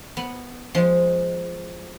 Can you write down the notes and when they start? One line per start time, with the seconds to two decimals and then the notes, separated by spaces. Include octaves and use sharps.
0.17 B3
0.75 F3 G#3